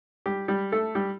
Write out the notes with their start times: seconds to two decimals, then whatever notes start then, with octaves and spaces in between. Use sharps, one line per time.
0.26 G3 G4
0.48 G3 G4
0.72 A3 A4
0.95 G3 G4